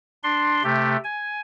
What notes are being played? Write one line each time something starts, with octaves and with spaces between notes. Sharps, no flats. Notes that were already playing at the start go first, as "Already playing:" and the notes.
D4 C6
C3 A3 G4
G#5